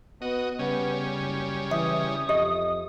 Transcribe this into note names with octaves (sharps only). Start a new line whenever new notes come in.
B3 F#4 D#5
C#3 G3 B3 C#4
F#1
E3 E5 D#6
F2 G4 D#5 E5